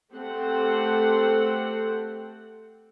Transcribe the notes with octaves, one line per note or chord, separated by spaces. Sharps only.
A3 C4 G4 A4 C5 F#5